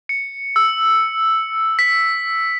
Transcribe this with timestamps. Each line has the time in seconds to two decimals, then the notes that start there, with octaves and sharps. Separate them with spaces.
0.09 C#7
0.56 E6
1.79 B6